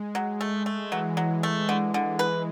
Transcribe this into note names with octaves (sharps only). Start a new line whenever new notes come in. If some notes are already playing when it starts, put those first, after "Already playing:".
Already playing: G#3
F#3
A3
A3
E3 F#3
F#3
A3
D3
D3
B4